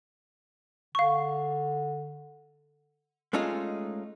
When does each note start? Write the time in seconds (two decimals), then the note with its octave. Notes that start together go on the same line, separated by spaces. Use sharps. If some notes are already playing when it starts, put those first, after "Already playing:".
0.95 D3 F5 C#6
3.33 G#3 A3 C#4 D#4 F4